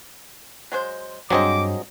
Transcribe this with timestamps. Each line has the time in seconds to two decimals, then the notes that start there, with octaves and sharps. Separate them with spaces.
0.72 F#3 G#3 C5
1.30 G2 D3 F3 F#3 C4 G#4 D#5 D6